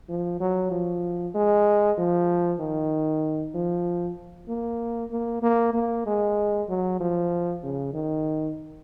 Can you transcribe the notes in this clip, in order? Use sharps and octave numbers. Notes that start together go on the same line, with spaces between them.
F3
F#3
F3
G#3
F3
D#3
F3
A#3
A#3
A#3
A#3
G#3
F#3
F3
C#3
D#3